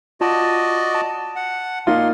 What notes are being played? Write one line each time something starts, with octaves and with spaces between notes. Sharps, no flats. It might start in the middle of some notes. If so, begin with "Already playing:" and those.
F4 F#4 D5 D#5 A5
A5
F#5
A#2 A#3 D#4 F4 C6